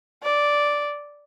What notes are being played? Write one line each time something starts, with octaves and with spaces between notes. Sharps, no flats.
D5